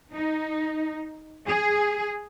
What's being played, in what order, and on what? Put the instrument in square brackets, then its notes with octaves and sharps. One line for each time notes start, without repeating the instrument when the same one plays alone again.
[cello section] D#4
G#4